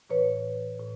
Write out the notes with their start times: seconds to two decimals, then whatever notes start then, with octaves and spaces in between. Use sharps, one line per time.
0.10 A2 E3 B4 C#5
0.80 A2